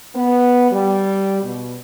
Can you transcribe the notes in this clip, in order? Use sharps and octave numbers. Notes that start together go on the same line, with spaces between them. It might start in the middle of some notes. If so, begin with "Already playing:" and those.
B3
G3
B2